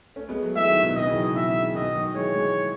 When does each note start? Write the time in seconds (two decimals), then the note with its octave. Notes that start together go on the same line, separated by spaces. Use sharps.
0.16 A3 C#4
0.29 G#3 B3
0.42 F#3 A3
0.55 E3 G#3 E5
0.69 D#3 F#3
0.83 B2 D#3
0.95 B2 D#3 D#5
1.06 C#3 E3
1.15 D#3 F#3
1.25 C#3 E3
1.31 B2
1.35 C#3 E5
1.48 C#3
1.62 C#3
1.75 B2 D#3 D#5
1.95 D#3 F#3
2.14 E3 G#3 C#5
2.34 E3 G#3